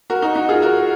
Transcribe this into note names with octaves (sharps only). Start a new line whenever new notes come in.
F#4 A#4
D#4 F#4
D#4 F#4
F4 G#4
F#4 A#4